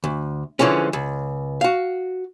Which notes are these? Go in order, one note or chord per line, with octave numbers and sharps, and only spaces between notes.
D2
D3 E3 F3 G#3 C#4
C#2
F#4 F5